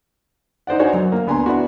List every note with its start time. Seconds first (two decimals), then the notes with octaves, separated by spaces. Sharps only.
0.67 D#4 C5 D5 F#5
0.79 D4 D#4 F#4 C5 C#5 G#5
0.93 F#2
1.12 A#3
1.27 D2 B3 G#5 A#5 C6
1.46 B3 D4 E4 F#4